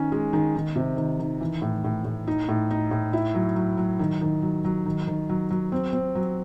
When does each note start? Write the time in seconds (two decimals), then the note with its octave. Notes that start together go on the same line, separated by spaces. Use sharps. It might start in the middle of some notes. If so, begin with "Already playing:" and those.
Already playing: D#3 C#4 D#4
0.12 G#3
0.33 D#3
0.55 D#3
0.76 C3
0.97 D#3
1.19 D#3
1.41 E3
1.62 A2
1.84 A2
2.05 A2
2.27 D#4
2.49 A2
2.70 D#4
2.91 A2
3.13 E4
3.35 F#3
3.56 F#3
3.77 F#3
3.99 D#3
4.21 D#3
4.42 F#3
4.65 F#3
4.86 D#3
5.07 D#3
5.29 F#3
5.50 F#3
5.72 C4
5.93 C4
6.15 F#3